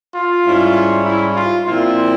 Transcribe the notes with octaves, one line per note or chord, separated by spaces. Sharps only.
F4
G#2 G3 C#4 E4
E4
F4
A#2 F3 C4 E4 F4